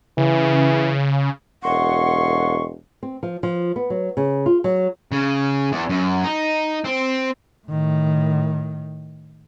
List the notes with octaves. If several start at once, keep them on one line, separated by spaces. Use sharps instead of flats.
C#3 E3
E1 F#2 F#5 C6 C#6
C4
F3
F3
B3
F#3
C#3
F4
F#3
C#3
E2
F#2
D#4
C4
A2 D#3